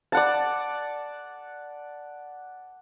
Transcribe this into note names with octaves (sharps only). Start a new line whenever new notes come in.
D5 F#5 A5